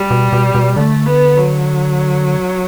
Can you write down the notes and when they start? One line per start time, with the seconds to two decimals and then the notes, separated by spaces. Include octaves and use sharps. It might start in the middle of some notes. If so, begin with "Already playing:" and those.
Already playing: G3
0.10 B2
0.33 B2
0.55 B2
0.76 D3 A3
1.06 B3
1.36 F#3